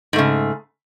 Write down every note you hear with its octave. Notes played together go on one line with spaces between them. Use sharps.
G#2 C#3 A3